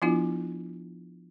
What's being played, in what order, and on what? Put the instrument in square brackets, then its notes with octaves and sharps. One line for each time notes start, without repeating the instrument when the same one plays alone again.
[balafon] F3 B3 D4 E4 F4